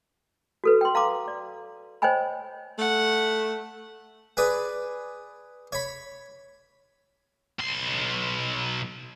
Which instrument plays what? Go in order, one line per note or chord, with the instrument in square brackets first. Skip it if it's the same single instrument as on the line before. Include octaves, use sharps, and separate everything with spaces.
[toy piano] F#4 A4 B4
G5 C6
F5 A#5 C6 D6
D5
C5 C#5 D#5 G5 G#5 B5
[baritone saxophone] A3 [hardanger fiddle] F#5
[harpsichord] G#4 B4 D5
C#5 B5
[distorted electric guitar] B1 C6